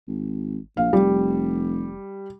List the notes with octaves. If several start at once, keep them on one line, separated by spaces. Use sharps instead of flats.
G#1
A#1 F5
F1 G3